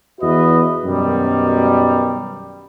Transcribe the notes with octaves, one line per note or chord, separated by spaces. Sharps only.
E2 F#4 B4 D#5 E5
F#2 B2 D#3 G3